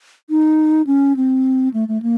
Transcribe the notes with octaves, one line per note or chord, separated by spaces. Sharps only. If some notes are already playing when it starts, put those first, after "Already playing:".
D#4
C#4
C4
A3
A3
A#3